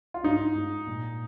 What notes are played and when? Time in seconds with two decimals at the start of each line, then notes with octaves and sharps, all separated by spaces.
0.14 F4
0.23 G#2 D#4
0.56 G#2
0.87 A#2